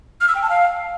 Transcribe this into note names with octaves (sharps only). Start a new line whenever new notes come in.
F6
E6
G5
A5
F5